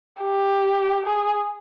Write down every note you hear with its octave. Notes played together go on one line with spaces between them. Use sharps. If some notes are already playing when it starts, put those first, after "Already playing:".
G4
G#4